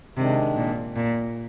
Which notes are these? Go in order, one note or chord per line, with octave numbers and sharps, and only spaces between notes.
C3 D#3 G#3 D4
A#2
A#2